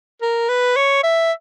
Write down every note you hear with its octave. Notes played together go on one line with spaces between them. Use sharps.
A#4
B4
C#5
E5